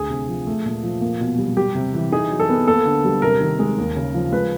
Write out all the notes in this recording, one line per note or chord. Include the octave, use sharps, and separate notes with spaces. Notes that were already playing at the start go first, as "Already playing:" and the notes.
Already playing: D2 G#4
C3
F3
A3
A#2
F3
A#3
B2
G3
G3 G4
C3
E3
D#4 G#4
F#3
A4
B3
A#3 A4
D3
G3
C3 A#4
D#3
G#3
D#2
C#3
F3
G#3 B4